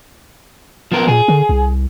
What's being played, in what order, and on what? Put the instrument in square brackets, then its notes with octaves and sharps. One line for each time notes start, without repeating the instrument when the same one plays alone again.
[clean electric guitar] F3 B3 A#4
[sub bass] A#2 [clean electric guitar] G#4
[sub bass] D3
C2